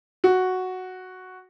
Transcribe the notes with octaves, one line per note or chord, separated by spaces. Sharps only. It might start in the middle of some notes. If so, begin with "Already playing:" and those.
F#4